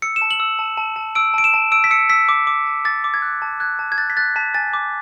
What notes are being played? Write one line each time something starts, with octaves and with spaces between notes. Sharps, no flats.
E6 C#7
E7
A5
F#7
E6
A5
A5
A5
E6 D7
A5 D7
E7
A5
E6 D7
B6
E6 C#7
E6 B6
D6
D6
A5
D6 A6
D6
G#6
F#6
A5
F#6 G#6
A5
G#6
F#6 A6
B6
F#6 A6
A5 B6
G#5 A6
D6